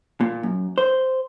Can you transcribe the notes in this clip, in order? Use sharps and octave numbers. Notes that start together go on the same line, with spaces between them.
A#2
F#2
C5